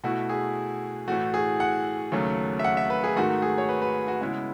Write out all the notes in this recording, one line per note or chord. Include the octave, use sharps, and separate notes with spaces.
B2 A3 E4 F#4
G#4
A2 E3 A3 F#4
G#4
F#5
D#2 C#3 F#3 A3
E5
F#5
E5
B4
G#4
G#2 D#3 A3 F#4
G#4
C#5
B4
B4
F#4
C#3 G#3 B3 E4